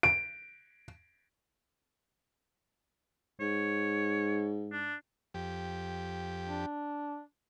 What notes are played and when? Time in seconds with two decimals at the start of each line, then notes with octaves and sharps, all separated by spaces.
0.03 D7
3.40 G#2 C#5
4.72 D4
5.34 F2 G4
6.48 D4